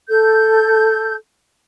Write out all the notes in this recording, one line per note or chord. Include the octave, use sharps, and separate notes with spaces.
A4 G6